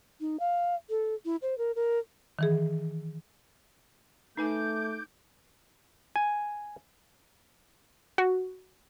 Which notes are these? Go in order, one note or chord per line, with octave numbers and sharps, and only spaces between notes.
D#4
F5
A4
E4
C5
A#4
A#4
D#3 E3 G#4
A3 D#4 B4 G#5 D6 G6
G#5
F#4